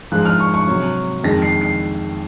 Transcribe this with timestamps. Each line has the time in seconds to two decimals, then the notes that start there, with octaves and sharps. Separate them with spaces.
0.12 G#2 F3 G#3 F#6
0.25 F6
0.40 C#6
0.54 C#6
0.67 C3 F#3
1.23 F2 D#3 G#3 A#6
1.42 C7
1.61 C7